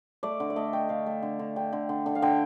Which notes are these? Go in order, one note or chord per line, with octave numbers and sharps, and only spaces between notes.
A3 D5
D3
D5
A3 D#5
A3 G5
D3 F5
A3
D3
D3
D3 G5
D3
D3
D3
F5
D3 G5